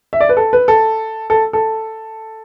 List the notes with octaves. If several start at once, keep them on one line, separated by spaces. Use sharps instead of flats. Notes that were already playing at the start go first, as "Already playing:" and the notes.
E5
D5
B4
A4
B4
A4
A4
A4